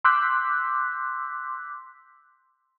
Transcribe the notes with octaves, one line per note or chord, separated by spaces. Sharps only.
C6 D6 E6 F#6 G6 B6